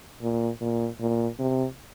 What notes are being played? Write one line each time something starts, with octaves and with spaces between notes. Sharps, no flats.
A#2
A#2
A#2
C3